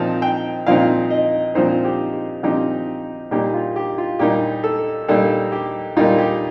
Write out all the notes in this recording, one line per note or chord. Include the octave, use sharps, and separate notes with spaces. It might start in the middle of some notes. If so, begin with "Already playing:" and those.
Already playing: A#2 F3 C4 D#4 A5
G5
A#2 F3 C4 D#4 F5
D#5
A#2 F3 C4 D#4 C5
G4
G4
A#2 F3 C4 D#4 G4
A#2 G3 A#3 D#4 G4
F4
G4
F4
A#2 G3 A#3 D#4 G4
A4
A#2 G3 A#3 D#4 A4
G4
A#2 G3 A#3 D#4 F4
G4